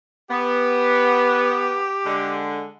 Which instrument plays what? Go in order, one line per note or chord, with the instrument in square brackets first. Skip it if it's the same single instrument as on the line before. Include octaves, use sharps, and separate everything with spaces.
[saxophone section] B3 [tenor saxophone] G4
[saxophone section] D3 G#3